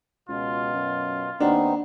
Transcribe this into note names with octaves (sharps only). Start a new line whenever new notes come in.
C#2 B2 F4
F#2
D#2 B3 C4 D4 D#4